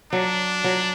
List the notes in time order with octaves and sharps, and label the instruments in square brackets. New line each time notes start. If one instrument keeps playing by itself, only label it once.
[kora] F#3 [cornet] D4
[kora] F#3